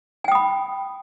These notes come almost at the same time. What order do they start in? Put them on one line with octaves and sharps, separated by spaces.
G#5 G5 D#6 B5